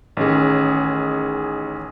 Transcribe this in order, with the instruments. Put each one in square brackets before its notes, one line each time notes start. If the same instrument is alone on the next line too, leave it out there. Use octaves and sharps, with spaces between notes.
[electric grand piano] A1 D#3 C#4 G#4